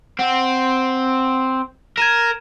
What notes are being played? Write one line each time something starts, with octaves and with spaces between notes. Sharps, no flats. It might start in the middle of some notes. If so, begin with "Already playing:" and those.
C4 F#5
A#4 G#6 D#7 E7